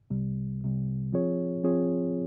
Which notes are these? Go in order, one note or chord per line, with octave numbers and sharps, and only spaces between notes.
C2 C3 G3
C2 C3 G3
F3 C4 F4 G#4 C#5
F3 C4 F4 G#4 C#5